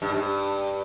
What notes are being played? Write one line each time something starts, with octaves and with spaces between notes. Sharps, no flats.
G2
G#2
G2